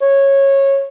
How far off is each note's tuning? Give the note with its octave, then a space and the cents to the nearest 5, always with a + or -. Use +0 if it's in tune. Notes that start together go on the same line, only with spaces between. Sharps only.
C#5 -15